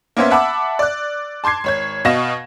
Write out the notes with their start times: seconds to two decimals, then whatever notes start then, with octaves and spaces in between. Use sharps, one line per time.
0.17 A#3 B3 C#4 C5 E5
0.31 E5 F#5 A5 B5 D6 E6
0.79 D5 F#6
1.44 A5 C6 D6 G#6 C7
1.64 G#1 C#5 G#6
2.05 B2 D#5 F5 C#6 A#6 E7